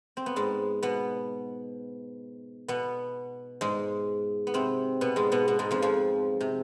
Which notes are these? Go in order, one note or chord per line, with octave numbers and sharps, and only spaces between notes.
C4
B3
G#2 G#3
B2 B3
B2 B3
G#2 G#3
B3
C3 C4
B2 B3
G#2 G#3
B2 B3
B2 B3
G#2 G#3
F2 F3
F2 F3
C3